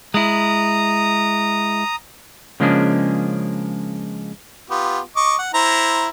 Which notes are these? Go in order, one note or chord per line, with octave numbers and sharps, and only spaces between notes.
G#3 E4 A#5 D#6
C#3 F3 G#3 A#3 C#4 D4
B3 F4 G4
D#5 C#6 D6
F#5
E4 C5 A#5